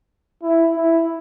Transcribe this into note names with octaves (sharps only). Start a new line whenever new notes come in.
E4
E4